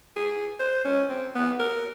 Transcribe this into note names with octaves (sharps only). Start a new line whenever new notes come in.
G#4
C5
C#4
C4
B3
A#4